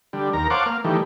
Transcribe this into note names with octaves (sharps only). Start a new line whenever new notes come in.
D3 G3
D#2 A#4 A#5
C5 C#5 F5 F#5 A5 D6
A#3 F5
D#3 E3 G3 A3